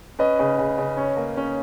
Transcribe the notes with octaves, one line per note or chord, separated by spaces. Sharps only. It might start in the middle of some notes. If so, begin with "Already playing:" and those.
C#4 B4 D#5
C#3
C#3
C#3
C#4 C#5
A#3
C#4